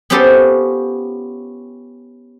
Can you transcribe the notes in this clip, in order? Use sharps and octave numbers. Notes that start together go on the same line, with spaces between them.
B3 C#4 F4 G4 A4 C5